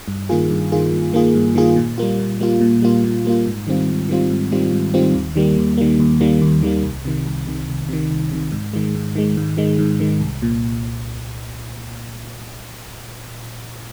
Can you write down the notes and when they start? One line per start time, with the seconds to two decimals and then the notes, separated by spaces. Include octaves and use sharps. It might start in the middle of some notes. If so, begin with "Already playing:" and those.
0.08 G2
0.29 D#3 A#3 F4 G#4
0.50 G2
0.72 D#3 A#3 F4 G#4
0.92 G2
1.13 D#3 A#3 F4 G#4
1.35 G2
1.55 D#3 A#3 F4 G#4
1.76 A#2
1.98 G3 A#3 F4
2.19 A#2
2.40 G3 A#3 F4
2.61 A#2
2.82 G3 A#3 F4
3.04 A#2
3.25 G3 A#3 F4
3.46 G#2
3.67 D#3 G3 C4 F4
3.89 G#2
4.09 D#3 G3 C4 F4
4.30 G#2
4.52 D#3 G3 C4 F4
4.72 G#2
4.94 D#3 G3 C4 F4
5.14 D#2
5.36 D#3 G3 A#3
5.57 D#2
5.77 D#3 G3 A#3
6.00 D#2
6.21 D#3 G3 A#3
6.41 D#2
6.62 D#3 G3 A#3
6.83 C2
7.05 C3 D#3
7.26 C2
7.47 C3 D#3
7.68 C2
7.89 C3 D#3
8.11 C2
8.32 C3 D#3
8.52 G#2
8.73 D#3 G#3
8.95 G#2
9.16 D#3 G#3
9.37 G#2
9.57 D#3 G#3
9.79 G#2
10.00 D#3 G#3
10.21 C2
10.42 A#2